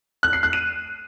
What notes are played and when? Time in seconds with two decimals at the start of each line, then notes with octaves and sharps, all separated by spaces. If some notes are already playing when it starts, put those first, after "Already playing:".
0.23 F#6
0.33 C7
0.43 F#6
0.53 D#7